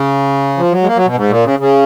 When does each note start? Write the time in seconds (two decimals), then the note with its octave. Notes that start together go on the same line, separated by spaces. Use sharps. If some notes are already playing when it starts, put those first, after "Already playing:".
Already playing: C#3
0.58 F3
0.72 F#3
0.83 G#3
0.87 A#3
0.96 F#3
1.06 B2
1.16 G#2
1.29 A#2
1.45 C#3
1.59 C#3